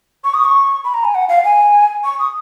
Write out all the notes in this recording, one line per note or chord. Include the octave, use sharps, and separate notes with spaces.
C#6
D#6
C#6
B5
A#5
G#5
F#5
F5
G#5
C#6
D#6